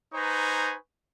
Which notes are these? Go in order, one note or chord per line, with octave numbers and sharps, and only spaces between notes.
D#4 B4 C5 G#5 A#5 C#6